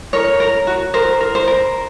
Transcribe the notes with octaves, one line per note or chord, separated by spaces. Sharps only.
A#4 C#5
A#4
F#4
A#4 C5
A#4
C5
A#4